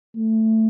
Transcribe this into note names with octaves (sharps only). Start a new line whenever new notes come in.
A3